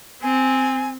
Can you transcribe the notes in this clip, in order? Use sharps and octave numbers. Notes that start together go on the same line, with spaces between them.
C4 G#5